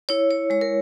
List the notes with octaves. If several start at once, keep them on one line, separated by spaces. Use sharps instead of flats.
E4 C#5
C#5
G#3 C#5
A#4